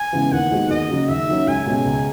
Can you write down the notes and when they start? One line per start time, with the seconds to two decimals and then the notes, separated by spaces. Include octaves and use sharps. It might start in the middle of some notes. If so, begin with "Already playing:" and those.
Already playing: G#5
0.13 C#3 E3 G#3 B3
0.32 D#2 F#5
0.51 D#3 G#3 B3 F#4
0.70 D#2 D#5
0.90 C#3 F#3
1.08 D#2 E5
1.28 D#3 F#3 C#4
1.47 C#2 G#5
1.66 B2 G#3 C#4
1.86 C#2